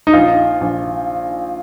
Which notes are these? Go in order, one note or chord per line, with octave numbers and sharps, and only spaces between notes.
D#4
A#1 F4
A#1